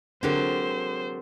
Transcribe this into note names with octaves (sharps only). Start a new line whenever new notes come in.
D3 F#3 C4 G4 G#4 A#4 C5